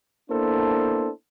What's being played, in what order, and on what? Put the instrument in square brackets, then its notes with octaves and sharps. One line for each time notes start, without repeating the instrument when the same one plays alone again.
[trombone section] A#3 B3 D4 E4 A4 C5